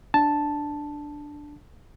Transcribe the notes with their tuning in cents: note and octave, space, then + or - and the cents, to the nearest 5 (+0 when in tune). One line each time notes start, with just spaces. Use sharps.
D4 +0 A5 +0